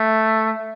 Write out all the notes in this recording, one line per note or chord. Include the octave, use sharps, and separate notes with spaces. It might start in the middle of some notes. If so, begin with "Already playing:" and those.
Already playing: A3